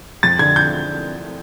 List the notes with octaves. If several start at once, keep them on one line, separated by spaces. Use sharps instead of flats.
F2 A6
D3 G#6
G6